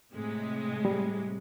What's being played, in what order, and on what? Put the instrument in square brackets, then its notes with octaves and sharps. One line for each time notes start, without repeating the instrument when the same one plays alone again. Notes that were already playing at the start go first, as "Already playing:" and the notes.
[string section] A2 C3 G#3
[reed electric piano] G3